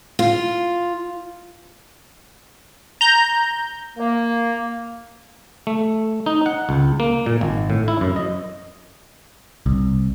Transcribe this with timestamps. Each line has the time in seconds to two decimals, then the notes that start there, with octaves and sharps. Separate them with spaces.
0.19 F4
3.01 A#5 G6
3.97 A#3
5.67 A3
6.26 D#4
6.46 F#5
6.69 C#2
7.00 A#3
7.26 A#2
7.41 G#1
7.70 A2
7.88 E4
8.01 F#2
8.16 D#5
9.66 C2